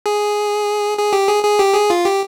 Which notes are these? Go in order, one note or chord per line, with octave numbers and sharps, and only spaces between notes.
G#4
G#4
G4
G#4
G#4
G4
G#4
F4
G4